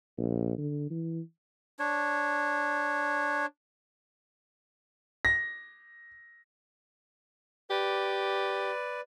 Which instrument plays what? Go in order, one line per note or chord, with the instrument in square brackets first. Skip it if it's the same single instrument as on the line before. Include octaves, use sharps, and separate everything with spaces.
[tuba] A#1
D3
E3
[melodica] D4 C#5
[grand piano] A#6
[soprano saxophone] G4 [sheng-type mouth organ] B4 D5